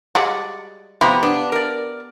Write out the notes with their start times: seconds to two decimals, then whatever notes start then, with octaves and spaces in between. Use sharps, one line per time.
0.15 G3 G#3 F#4 D5
1.01 C3 F3 B3 E4 G4 A#5
1.23 B3 D4
1.52 A#4 D5